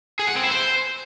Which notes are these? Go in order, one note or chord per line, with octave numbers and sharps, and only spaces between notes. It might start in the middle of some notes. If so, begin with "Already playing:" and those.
G#4
F#5
C4
E4
C5